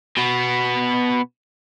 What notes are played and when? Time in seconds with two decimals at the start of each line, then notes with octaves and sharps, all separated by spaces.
0.17 B2 B3